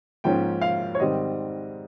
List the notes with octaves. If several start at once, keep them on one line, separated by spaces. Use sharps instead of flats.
G#2 F3 A#3 C#4 G5
F5
C#5
G#2 D#3 G3 C4 D#5